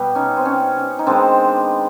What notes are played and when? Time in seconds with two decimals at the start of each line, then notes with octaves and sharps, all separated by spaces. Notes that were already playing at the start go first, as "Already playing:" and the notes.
Already playing: B2 G3 B3 G4
0.15 C#4 D#4
0.37 C4
0.45 C#4
0.77 C#4
0.99 D#4
1.07 D#3 G#3 B3 C4 D4